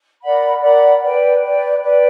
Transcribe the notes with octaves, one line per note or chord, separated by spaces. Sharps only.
A#4 D5 F#5 B5
A#4 D5 F#5 B5
B4 D5 G5
B4 D5 G5
B4 D5 G5